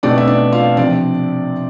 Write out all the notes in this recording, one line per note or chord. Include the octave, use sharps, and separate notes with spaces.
B2 A3 C4 D4 D5
E5
D4 D5
F4 F5
C3 F3 C4 D4 D5